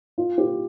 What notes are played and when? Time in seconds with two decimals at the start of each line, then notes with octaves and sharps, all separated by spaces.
0.18 F4
0.38 G4